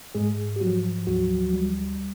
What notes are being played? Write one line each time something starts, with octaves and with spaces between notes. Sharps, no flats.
G#2 G#3 G#4
G4
F3 F#3 F#4
D2 F#3 F#4
G3